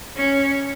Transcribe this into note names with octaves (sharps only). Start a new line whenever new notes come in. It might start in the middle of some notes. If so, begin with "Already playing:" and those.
C#4